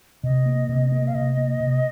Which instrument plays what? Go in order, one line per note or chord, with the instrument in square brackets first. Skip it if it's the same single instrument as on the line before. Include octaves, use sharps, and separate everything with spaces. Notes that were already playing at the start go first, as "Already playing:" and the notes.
[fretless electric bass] C3 [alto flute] D#5
[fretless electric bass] A#3
C3
A#3
[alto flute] F5
[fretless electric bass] C3 [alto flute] D#5
[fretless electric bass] A#3
C3